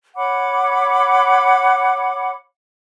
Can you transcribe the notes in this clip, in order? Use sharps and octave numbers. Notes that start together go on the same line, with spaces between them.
C#5 F#5 B5 D6